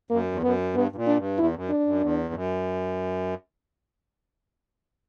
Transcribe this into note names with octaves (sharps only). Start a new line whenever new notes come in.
F#2 A#3
E2
F#2 B3
G2 B3
G2
A#2
D4
G2
E2 E4
F#2
D4
F#2
E2
G2
F#2